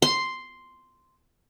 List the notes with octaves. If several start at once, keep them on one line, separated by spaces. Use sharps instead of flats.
C6